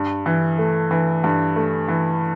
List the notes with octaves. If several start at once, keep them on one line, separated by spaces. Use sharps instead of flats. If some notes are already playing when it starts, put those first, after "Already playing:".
Already playing: G2
E3
A3
E3
G2
A3
E3